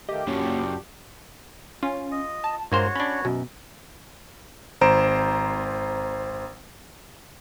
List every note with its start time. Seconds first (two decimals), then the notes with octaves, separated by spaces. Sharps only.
0.09 D#3 A3 A#3 G4 D#5
0.27 F#2 A#2 C#3 A#3 D4 F#4 C#5
1.83 C#4 F4
2.12 D#5
2.44 A5
2.72 G2 A#2 G#3 A#3 F#4 C5 C#5 C6
2.96 C#4 D4 B5
3.25 F#2 B2
4.81 G#1 C5 A#5 D7 E7